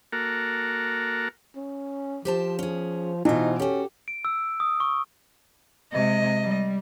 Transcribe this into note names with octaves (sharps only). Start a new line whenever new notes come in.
A#3 F#4 A4 A#4
C#4
F3 G4 C5 A5
C#4 G#4
B2 E3 D#4 F4 C5
C#4 F#4 G4 A4
D7
E6
D#6
C#6
C3 G#3 D#5
G3